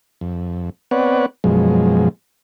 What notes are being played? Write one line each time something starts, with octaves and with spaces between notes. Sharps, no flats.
F2
B3 C4 B4 C#5 D5 F#5
F#2 B2 F3 G#3